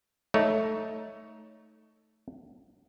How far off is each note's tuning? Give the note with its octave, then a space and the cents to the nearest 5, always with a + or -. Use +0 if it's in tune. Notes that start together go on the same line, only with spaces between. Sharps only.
A3 +0 D#4 +15 C#5 +10